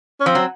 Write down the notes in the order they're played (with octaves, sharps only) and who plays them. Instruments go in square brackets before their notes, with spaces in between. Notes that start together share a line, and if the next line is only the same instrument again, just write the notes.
[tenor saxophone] C#4
[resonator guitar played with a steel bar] F3 [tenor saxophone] C4
[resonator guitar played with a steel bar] F#3